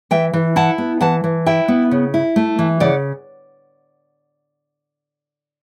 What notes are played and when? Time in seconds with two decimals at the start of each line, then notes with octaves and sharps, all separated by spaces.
0.11 E3 E5 G5
0.33 E3
0.56 E4 F#5 A5
0.78 B3
1.01 E3 F#5 A5
1.24 E3
1.46 E4 E5 G5
1.68 B3
1.91 C#3
2.14 E4
2.36 A3
2.59 E3
2.80 C#3 D5 F#5